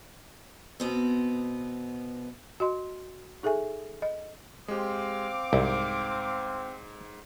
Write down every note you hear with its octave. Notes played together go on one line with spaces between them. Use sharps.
B2 B3 C4
F#4 D#5 C6
D#4 G#4 A4 E5 G#5
D#5
G#3 C4 G4 F5 D6
C2 G#2